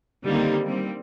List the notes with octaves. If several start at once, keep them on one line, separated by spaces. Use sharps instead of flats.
D3 D#3 G3 A#3 C4 D#4
G3 A#3 C4